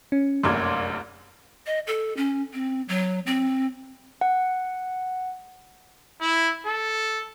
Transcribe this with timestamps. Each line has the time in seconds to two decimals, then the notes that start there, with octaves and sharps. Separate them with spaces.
0.12 C#4
0.44 F1 A#1 F#2 C6 D6 G#6
1.66 D#5
1.87 A4
2.17 C#4
2.53 C4
2.88 F#3
3.26 C4
4.21 F#5
6.21 E4
6.66 A4